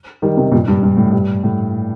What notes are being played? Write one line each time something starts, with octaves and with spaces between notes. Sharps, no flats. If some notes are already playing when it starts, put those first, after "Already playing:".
D#3 G3
C3 D#3
G2 A#2
G2
G2
A2
G2
A2